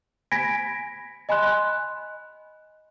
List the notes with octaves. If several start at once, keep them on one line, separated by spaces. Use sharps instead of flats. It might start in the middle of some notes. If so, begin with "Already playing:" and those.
G#5 B5 G#6 A#6 B6 D7
D#5 G#5 B5 C6 F#6